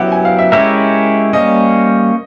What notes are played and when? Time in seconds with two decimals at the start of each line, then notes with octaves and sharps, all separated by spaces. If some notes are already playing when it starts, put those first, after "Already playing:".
Already playing: F#3 B3 E4 G4 F#5
0.12 G#5
0.25 F5
0.39 E5
0.52 G#3 C#4 E4 G4 A#4 E5
1.33 G3 A#3 C#4 D#5